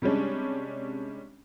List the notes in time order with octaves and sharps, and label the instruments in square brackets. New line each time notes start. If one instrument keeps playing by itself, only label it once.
[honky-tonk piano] C3 G3 G#3 C#4 D4